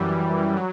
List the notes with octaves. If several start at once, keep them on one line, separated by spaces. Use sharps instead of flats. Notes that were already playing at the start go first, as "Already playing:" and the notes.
Already playing: F#2 E3 G3
F#3